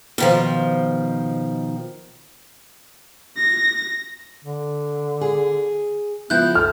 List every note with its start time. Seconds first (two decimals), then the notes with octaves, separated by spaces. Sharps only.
0.18 B2 D#3 F3
3.37 A#6
4.44 D3
5.21 G#4
6.30 C#3 F3 B3 E4 F#6 G6
6.55 A4 F6